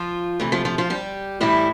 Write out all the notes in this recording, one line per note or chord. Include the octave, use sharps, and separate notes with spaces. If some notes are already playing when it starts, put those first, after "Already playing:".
Already playing: F3 F4
C3 E3 A3
F3 F4
F3 F4
F3 F4
G3 G4
A2 E3 G3 E4